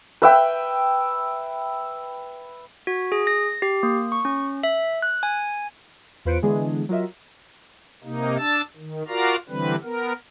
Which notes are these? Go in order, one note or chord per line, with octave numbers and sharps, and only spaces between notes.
B4 E5 G5
F#4
G#4
A#6
G4
A#3
C#6
C#4
E5
F#6
G#5
E2 F4 B4 C5 C#7 D7
D3 E3 G#3 B3 D4 G#4
F#3 F4 A#4 D#5 E5
C3 A#3 D#4
D4 A5 E6 A6
D#3
F4 F#4 A#4 D5 F5 A#5
D3 E3 G3 C4 B4
B3 A#4